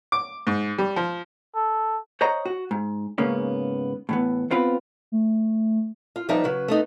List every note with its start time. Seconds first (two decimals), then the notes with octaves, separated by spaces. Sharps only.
0.12 D6
0.47 G#2
0.78 G3
0.96 F3
1.55 A4
2.21 C5 C#5 D#5 F#5 A#5
2.46 F#4
2.71 G#2
3.18 G#2 C#3 A#3 B3 C#4
4.09 A2 E3 B3
4.51 B3 C4 F4 B4
5.12 A3
6.16 F4
6.29 F3 G3 B3 D#4 E5
6.44 C#3 F#3 B4
6.68 A3 B3 D#4